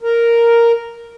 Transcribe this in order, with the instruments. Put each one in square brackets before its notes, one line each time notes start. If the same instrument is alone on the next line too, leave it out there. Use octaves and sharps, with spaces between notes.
[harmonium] A#4